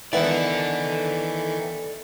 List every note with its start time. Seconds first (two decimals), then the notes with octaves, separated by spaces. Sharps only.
0.13 D#3 E3 B3 E4 A4 D5